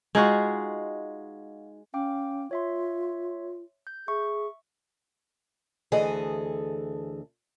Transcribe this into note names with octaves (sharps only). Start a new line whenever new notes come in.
G#3 D#4 F4 F#4
C#4 F5 G5 D6
F4 C#5 E5 C6
G6
G#4 E5 C#6
D2 E3 G#4 A4 D#5